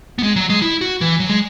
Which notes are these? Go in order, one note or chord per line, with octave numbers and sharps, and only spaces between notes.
B3
G#3
F#3
G#3
E4
F#4
E3
F#3
G#3